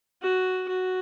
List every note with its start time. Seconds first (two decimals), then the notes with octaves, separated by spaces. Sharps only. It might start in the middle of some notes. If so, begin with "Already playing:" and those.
0.22 F#4
0.68 F#4